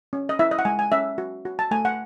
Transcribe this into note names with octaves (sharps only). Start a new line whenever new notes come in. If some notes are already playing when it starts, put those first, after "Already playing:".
C#4
D#5
E4 E5
D#5
F#5
G#3 G#5
G#5
C#4 E5
F#4
F#4
A5
A3 G#5
F#5